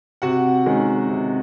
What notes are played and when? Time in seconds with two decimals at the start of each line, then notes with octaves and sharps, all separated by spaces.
0.22 C3 F#4 F#5
0.66 D#3 G#3 C#4
1.09 C3